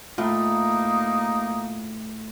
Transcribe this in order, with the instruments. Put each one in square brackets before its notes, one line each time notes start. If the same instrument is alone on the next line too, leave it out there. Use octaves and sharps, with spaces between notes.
[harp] A2 [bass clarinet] A#3 [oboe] D#4 [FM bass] F4